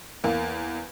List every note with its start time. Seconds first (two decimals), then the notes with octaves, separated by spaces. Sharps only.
0.24 E2 A#3